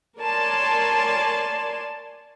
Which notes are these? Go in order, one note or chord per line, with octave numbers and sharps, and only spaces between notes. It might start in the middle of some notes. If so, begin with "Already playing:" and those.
A#4 C#5 D5 G#5 A5 C6